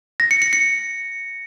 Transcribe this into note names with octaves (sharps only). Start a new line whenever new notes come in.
A#6
C#7
C#7
C#7